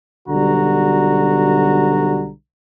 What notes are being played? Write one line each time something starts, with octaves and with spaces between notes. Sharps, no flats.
B1 D3 G3 F#4 A#5